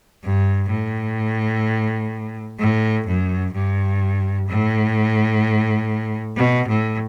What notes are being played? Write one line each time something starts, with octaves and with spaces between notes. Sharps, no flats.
G2
A2
A2
F#2
G2
A2
B2
A2